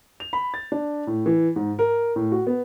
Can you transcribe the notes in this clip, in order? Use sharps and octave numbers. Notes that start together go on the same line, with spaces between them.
F7
B5
A6
D4
A2
E3
G#2
A#4
A2
F#4
B3